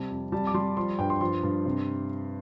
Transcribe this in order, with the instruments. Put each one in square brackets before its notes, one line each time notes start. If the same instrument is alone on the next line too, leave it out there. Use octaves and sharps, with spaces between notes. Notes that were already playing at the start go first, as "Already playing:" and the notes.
Already playing: [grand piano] C3 G3 A5
F2
G3 A5
D6
G3 C6
F3 C6
G2 G5
C6
F3 C6
G2
C3